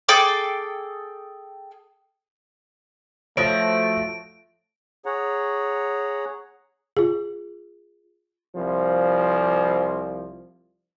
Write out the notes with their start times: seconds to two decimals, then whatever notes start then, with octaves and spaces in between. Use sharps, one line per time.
0.09 G#4 A4 G5 D6
3.37 F3 A3 F#4 C#5 D#6 A#6 D7
5.06 G#4 C#5 F#5 A#5
6.97 F4 G#4
8.55 C2 F3